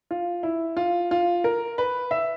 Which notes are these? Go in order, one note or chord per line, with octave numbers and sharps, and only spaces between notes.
F4
E4
F4
F4
A#4
B4
E5